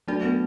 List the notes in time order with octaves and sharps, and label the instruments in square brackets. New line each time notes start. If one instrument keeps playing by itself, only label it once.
[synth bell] F#3 D4 F#4 D5 [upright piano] A3
[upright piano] B3